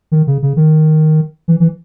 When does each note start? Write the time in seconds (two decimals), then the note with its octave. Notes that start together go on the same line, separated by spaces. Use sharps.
0.12 D#3
0.27 C#3
0.43 C#3
0.57 D#3
1.48 E3
1.60 E3